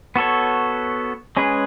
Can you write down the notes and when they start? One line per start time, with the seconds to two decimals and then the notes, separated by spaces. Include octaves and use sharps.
0.16 B3 F#4 A4 C#5
1.37 G#3 C#4 G#4 B4